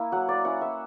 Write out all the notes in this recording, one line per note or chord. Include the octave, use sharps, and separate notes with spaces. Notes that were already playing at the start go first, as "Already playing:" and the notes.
Already playing: A#3 E4
F#3 F#5
D5
C#4 E4 F#5
E5